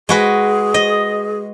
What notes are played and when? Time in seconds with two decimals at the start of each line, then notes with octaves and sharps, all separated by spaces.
0.09 G#3 F#4 G#4 B4
0.74 D#5